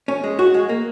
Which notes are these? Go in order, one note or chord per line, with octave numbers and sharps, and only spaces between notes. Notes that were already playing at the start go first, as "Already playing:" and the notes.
C#4
G#3
F#4
G#3
A#3